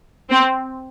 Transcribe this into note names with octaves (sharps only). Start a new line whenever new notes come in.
C4